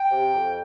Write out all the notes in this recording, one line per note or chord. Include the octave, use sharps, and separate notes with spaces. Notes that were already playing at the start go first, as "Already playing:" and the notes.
Already playing: G5
C3
F2